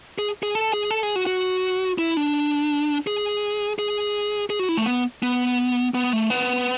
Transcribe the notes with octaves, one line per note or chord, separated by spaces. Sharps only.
G#4
G#4
A4
G#4
A4
G#4
F#4
F#4
E4
D4
G#4
G#4
G#4
F#4
E4
A3
B3
B3
B3
A3
B3